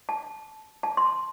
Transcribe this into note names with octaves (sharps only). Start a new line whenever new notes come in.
A5
A5
C6